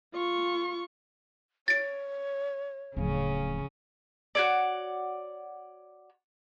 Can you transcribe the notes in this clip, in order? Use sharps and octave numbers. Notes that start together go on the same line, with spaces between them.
F4 C#6
C#5 A6 D7
D1 C#3 F3 C#4
F#4 C#5 D5